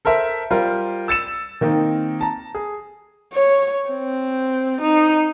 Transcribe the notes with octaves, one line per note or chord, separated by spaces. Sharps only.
A4 A#4 C5 E5
G3 F4 A#4 C5
E6 A6 C#7 E7
D#3 A#3 C4 D#4
A5 A#5
G#4
C#5
C4
D#4